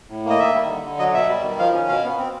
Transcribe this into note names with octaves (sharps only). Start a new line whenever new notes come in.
A2
A#3
D#5
D#3 E5
G3
D3
D3
F#3 D#5
B2 E5
G3
D#3
F3 F5
C#4
B2 F5
B3
C4